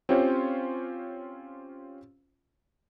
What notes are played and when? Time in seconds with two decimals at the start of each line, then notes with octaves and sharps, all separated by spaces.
0.09 C4 C#4 F4 G4 C5 C#5